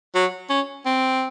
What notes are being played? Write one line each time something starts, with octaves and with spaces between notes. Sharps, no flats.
F#3
C#4
C4